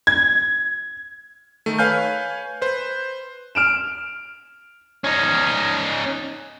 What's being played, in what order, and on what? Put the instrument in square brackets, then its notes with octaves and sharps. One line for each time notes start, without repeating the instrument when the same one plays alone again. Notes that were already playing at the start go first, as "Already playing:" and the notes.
[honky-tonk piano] G#6
[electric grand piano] D#3 A3
B4 C#5 F5 G#5 F6 G6
B4 C5
[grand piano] F6 D7 E7
[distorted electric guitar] C#4 D#4